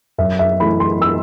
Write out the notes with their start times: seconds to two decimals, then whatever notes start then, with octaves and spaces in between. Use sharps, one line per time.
0.18 F#2 E5
0.39 E5
0.60 E3 A3 B5
0.80 C6
1.02 E6